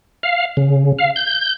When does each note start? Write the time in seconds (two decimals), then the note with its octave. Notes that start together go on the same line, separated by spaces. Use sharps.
0.23 F5
0.57 C#3
0.99 F5
1.16 G6